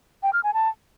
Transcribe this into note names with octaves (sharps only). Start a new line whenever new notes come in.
G5
F6
G#5
A5